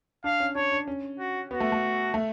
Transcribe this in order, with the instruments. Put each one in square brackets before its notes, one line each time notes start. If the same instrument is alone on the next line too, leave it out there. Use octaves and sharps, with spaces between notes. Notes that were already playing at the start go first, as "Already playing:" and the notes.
[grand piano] D4 [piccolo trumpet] F5
[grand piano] C#4
[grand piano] D4 [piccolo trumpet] C#5
[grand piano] D4
C#4
[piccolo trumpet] F#4
[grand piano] B3 [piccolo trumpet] F#4
[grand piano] A3
A3
A3